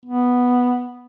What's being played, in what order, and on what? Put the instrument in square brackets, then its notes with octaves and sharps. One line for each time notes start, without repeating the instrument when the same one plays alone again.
[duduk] B3